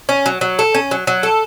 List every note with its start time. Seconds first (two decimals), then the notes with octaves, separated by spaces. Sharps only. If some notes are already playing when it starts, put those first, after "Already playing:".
0.09 C#4
0.26 F#3
0.41 F#3
0.59 A4
0.74 C#4
0.91 F#3
1.07 F#3
1.23 A4